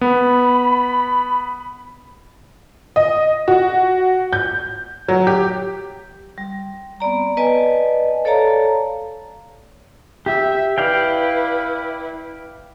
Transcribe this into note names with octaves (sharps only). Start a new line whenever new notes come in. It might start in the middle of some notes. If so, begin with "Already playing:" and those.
B3 B5
D#5
F#4
G6
F#3
G4
G3
B3 C4 D5 A#5
B4 D5 D#5 G#5 A5
A4 C#5 D5 F5 A5 A#5
G4 E5
E4 B4 D5 F5 G5